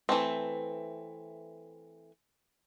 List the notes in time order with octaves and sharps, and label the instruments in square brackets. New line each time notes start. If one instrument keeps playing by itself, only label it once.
[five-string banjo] E3 A3 C4